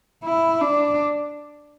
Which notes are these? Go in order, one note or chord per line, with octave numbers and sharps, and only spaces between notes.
E4
D4